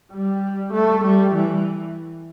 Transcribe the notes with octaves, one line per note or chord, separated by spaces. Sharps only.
G3
A3
G3
E3